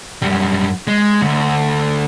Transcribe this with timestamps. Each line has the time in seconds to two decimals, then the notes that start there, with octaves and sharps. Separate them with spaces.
0.22 F#2 G3
0.87 G#3
1.22 D2